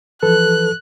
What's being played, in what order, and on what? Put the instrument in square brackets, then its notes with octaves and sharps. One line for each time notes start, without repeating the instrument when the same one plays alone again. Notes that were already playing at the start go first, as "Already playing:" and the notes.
[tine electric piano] E3 B4 [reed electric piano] F3 A4 [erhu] F#6